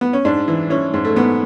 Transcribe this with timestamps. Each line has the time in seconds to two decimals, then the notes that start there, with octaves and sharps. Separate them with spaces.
0.01 B3
0.13 C#4
0.25 G#2 D4
0.48 E3
0.70 E3 C#4
0.94 G#2
1.05 A3
1.16 G#2 B3